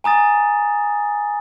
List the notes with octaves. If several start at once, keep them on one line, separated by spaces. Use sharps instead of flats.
G#5 A#5 D#6 A6